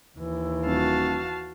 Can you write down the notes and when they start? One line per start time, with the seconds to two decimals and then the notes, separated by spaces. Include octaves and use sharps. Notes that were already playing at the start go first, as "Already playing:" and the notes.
0.18 D#2 E3
0.66 D#1 F#4 F5 A5